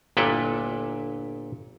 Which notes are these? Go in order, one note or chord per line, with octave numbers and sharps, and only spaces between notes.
G1 A#2 E4 A4 B4 G5